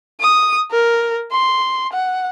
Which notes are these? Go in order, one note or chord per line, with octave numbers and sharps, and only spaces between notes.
D#6
A#4
C6
F#5